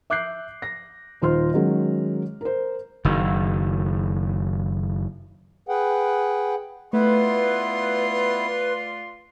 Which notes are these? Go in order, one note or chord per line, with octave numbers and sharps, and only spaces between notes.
E5 D6 F#6 G6 C7
A#6
D#1 D#4 F4 C5 C6 F6
D#3 F#3 G#3 C#4
A#4 C5
F#1 D#3
G#4 B4 F#5 G5
A3 B3 E4 F4 B4 D5 C6